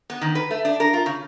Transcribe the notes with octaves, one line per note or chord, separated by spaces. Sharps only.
B3
D#3
B4
A3
D4
A#4
F4
C#3